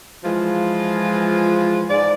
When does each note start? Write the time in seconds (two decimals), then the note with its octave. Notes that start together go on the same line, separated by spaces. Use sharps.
0.24 E3 F3 G#3 F4
1.90 G#2 D5